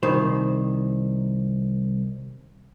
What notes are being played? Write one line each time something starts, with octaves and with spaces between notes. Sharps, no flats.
C2 D#3 C5